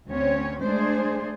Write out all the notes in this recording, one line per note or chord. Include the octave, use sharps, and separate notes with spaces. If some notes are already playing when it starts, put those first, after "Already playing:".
D2 C4 C#4 C#5
G#3 A3 D4 G#4 C5